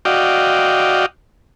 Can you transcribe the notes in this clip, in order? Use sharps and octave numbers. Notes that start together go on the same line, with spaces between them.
F#4 D5 D#5 F5 G5